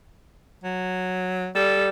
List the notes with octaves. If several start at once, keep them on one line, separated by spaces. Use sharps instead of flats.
F#3
G3 A4